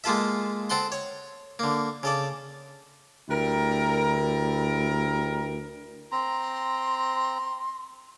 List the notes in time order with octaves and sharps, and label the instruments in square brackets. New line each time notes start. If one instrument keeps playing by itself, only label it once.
[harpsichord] G#3 A#3 F4 A4 E5
C4 A4 F#5 C6
C#5
D3 A#3
C#3 A4 D5
[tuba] D2 [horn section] G3 E4 A#4
[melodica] C4 A#5 [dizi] C6